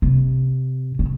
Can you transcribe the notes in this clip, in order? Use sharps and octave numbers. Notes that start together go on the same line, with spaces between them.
C3
C#3